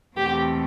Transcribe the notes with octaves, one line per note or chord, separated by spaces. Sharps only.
E2 B2 A3 C4 G4